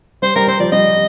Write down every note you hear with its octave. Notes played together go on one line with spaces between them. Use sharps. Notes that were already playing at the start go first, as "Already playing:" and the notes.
G3 C5
G3 A#4
G3 C5
F3 D5
G3 D#5